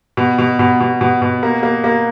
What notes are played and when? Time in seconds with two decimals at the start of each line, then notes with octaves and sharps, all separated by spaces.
0.17 B2
0.38 B2
0.59 B2
0.80 B2
1.01 B2
1.22 B2
1.43 A#3
1.63 A#3
1.84 A#3